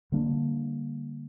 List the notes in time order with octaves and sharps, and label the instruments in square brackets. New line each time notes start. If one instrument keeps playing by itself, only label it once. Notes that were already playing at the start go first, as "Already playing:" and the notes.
[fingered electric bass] D3 G3 A#3 D4